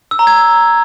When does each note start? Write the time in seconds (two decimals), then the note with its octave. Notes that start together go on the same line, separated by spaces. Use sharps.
0.11 E6
0.19 A#5
0.27 G#6